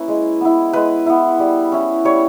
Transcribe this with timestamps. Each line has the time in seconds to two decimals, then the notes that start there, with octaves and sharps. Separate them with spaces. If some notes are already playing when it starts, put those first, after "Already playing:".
Already playing: A#3 C#4 E4 B4
0.08 G#3
0.41 B3 E4
0.73 G#3 B4
1.06 B3 E4
1.39 G3
1.72 C#4 E4
2.05 G3 C#5